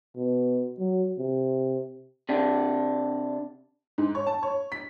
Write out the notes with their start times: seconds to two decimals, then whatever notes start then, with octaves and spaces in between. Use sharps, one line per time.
0.17 B2
0.79 F#3
1.18 C3
2.29 C3 D4
3.98 G#2
4.15 C#5
4.26 A5
4.43 C#5
4.72 B6